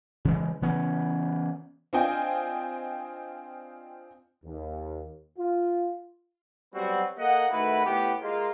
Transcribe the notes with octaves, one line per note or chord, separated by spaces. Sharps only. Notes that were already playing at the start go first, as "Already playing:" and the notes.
C#3 E3 G#3
C#3 E3 B3 C#4
C4 D4 F4 D#5 G5 G#5
D#2
F4
F#3 G3 B3 C4 F#4
A#3 A4 D#5 F#5
D#3 A3 E4 F#4 B4
A2 B3 G4
G#3 A#3 F4